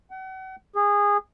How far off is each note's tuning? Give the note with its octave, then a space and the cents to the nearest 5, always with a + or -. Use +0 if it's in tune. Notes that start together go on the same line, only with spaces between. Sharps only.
F#5 +40
G#4 -20